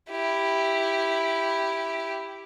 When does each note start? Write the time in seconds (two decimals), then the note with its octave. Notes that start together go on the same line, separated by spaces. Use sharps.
0.10 E4 G4